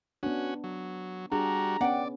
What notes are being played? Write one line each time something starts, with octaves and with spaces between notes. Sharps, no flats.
B3 C#4 D4 F#4
F#3
G3 D4 F#4 G#4 A#5
B3 C#4 D5 F#5 G5